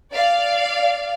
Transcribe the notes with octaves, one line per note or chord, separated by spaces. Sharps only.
D5 F5